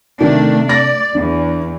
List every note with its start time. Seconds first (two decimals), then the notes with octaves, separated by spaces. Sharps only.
0.21 C3 D#3 A3 D4
0.69 D5 A#6
1.15 E2 B3 D4